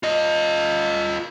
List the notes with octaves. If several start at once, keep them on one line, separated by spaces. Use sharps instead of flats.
F4 D#5